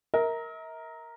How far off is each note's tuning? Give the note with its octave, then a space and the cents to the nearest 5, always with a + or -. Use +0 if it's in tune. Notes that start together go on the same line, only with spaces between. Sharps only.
A#4 +0 E5 -45